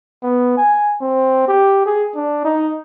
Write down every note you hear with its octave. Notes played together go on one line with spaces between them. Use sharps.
B3
G#5
C4
G4
G#4
D4
D#4